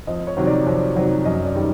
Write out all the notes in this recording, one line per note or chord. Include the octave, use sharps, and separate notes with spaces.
F2 D#5
C#5
C3 D#3 F#3
D5
F2 C#5
C3 D#3 F#3 D5
F#2 D#5
D5
D#3 G3